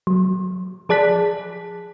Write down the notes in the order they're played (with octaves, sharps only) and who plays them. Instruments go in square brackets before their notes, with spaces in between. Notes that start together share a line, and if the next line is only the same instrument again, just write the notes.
[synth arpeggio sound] F#3
F3 G#4 D5 A5 F#6 B6